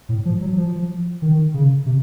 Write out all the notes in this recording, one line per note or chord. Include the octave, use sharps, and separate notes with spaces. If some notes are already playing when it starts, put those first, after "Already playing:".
A2
F3
F#3
F3
D#3
C#3
C3